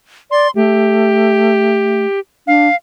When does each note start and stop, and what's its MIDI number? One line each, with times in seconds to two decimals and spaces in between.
0.31 0.48 74
0.31 0.51 84
0.55 2.06 57
0.55 2.20 67
2.47 2.68 62
2.47 2.75 77